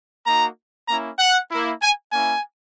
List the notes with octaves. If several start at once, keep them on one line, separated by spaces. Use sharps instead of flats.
A#3 D#4 F#4 A#5
A#3 C#4 E4 A#5
F#5
A#3 E4
G#5
A#3 C#4 E4 G#5